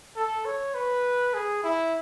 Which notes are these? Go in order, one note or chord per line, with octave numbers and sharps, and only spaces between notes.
A4
C#5
B4
G#4
E4